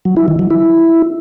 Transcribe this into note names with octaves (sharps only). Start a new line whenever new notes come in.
F#3
E4
D#3
F#3
E4